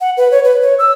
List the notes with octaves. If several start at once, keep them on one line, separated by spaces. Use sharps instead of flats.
F#5
B4
C#5
B4
C#5
E6